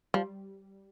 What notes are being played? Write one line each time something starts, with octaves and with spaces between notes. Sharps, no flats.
F3 G3